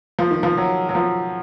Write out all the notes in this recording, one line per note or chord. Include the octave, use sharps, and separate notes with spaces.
F3
D#3
F3
F#3
F#3
F3